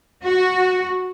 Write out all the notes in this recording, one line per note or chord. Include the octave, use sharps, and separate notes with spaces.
F#4